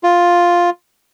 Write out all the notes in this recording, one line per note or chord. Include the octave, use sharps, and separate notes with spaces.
F4